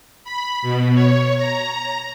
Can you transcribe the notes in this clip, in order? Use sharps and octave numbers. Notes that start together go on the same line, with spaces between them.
B5
B2
C#5
A#5